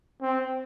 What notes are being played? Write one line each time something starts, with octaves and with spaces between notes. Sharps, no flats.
C4